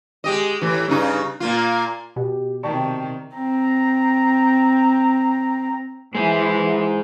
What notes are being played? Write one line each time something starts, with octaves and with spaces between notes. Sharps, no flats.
G#3 G4 D#5
A2 E3
G2 C#3 D#4
A#2 A#3 F4
B2 G4
C3 D#3 D5 G5 A5 C#6
C4 A#5
E3 G#3 C5